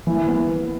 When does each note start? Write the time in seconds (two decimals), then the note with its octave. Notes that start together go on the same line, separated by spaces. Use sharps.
0.07 E3
0.28 B3